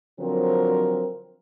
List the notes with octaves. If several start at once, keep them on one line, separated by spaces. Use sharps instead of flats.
D3 F3 F#3 C4 A#4